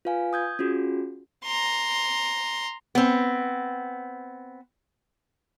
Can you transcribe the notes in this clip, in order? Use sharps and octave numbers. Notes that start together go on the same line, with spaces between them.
F4 B4 F5 G#5
D#6 G6 G#6
C#4 F4 F#4 G#4
A#5 C6
B3 C4